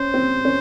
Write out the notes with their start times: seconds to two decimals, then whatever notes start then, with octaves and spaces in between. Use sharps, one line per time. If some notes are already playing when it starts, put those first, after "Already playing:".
Already playing: C#4 C5
0.14 C4
0.45 C#4